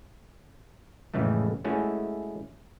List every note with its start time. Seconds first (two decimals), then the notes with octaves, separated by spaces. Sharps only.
1.14 F2 A2 C#3 E3 G#3 A3
1.64 G#3 A3 C#4 E4 F#4